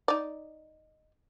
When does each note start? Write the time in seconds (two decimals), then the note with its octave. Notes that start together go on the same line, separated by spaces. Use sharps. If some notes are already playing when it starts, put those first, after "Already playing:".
0.08 D#4 D5